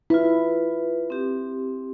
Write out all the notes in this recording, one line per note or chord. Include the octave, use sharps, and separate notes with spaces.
E4 F4 B4
C4 G4